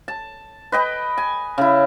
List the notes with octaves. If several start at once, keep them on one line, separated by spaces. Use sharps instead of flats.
A5
B4 D#5 G5
G#5
C#3 E4